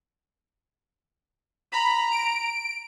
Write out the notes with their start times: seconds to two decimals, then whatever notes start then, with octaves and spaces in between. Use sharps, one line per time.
1.72 A#5 B5
2.11 D7